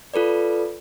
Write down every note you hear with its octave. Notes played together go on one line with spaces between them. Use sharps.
F4 A4 B4 D5